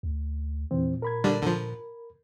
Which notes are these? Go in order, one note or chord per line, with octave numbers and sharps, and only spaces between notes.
D2
E2 A#2 E3 C4
A#4 B5 G#6
D3 G3 D4
D3 F3